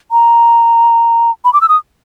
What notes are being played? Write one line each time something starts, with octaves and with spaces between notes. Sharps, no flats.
A#5
B5
D6
E6
D#6